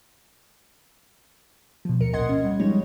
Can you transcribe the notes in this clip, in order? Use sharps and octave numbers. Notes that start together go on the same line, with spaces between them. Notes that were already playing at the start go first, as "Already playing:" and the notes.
B2 F3
D2 A#4 C#7
A1 A#2 D#5 F#5 C6 G#6
C#4
G3
F3 G3 G#3 D#4 C#5